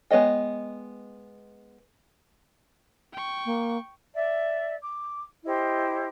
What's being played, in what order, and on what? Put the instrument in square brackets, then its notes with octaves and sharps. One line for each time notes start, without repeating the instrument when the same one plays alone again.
[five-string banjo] G#3 B3 C#5 D#5 G5
[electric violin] G5 C#6
[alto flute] A#3
[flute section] D5 E5
D6
E4 G4 C5 D#5